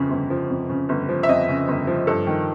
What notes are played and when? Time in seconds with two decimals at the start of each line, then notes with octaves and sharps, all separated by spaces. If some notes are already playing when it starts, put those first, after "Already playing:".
Already playing: G1 F2 C#3 F3
0.10 G1
0.30 F3
0.50 F2
0.70 C#3
0.89 G1
1.09 F3
1.23 E5
1.29 F2 D#5
1.48 C#3
1.68 G1
1.87 F3
2.07 G2 A4
2.27 D#3